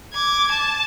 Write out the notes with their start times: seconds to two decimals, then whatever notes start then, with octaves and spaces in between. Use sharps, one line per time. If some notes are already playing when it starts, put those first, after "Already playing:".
0.13 D6 G#6
0.52 A5